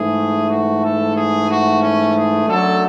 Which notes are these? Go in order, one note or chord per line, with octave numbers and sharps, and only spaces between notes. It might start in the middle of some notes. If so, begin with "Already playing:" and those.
Already playing: G#2 E3 A3 G#4
F#4
A4
G#4
F#4
C#4
G#4
F#2 D3 F#3 A3 A4